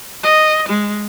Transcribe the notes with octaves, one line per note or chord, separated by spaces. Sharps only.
D#5
G#3